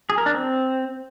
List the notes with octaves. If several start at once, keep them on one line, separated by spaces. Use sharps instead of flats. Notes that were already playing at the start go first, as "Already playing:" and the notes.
G#4
A#4
D4
C4